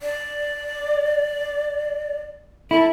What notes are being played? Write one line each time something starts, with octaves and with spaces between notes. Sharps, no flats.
D5
E4 A4